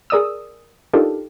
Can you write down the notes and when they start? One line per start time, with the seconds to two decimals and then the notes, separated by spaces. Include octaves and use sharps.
0.10 G#4 A#4 D5 D#6 E6
0.93 D4 D#4 F4 G4 A4 A#4